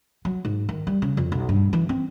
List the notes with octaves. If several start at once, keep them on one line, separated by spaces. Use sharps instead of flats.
F#3
G#2
D#3
G3
C#3
F2
B1
G2
E3
C4